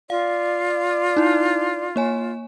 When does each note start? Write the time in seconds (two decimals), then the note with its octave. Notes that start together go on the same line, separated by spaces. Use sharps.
0.10 F4 D5 F5
1.17 D#4 E4
1.96 A#3 C#5 G#5